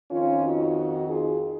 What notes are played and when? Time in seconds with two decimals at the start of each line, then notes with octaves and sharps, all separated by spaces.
0.11 F2 D#3 C#4 F4
0.44 D#4 F#4
1.09 F4 G#4